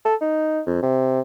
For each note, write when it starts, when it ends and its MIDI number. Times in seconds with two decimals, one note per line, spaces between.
0.05 0.15 69
0.21 0.61 63
0.67 0.80 41
0.83 1.21 48